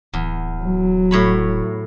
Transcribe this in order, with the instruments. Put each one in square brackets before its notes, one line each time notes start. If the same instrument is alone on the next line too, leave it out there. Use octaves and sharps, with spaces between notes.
[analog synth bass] D1 [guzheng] E2
[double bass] F#3
[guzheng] A2 C#5 B5